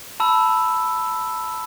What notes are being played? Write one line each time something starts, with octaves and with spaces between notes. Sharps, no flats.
A5 B5 E6